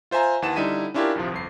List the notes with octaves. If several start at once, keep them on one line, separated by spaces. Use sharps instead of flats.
F4 C5 E5 G#5 A#5
D#2 E3 F#5 A5 E7
D3 G3 D#4 E4 B6 D#7
C#4 D4 E4 F4 G4 A#4
A#1 D#2 C3 F3
G1 F2 C7